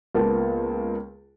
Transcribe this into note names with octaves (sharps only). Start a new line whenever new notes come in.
C#2 A#3 B3 F4 A5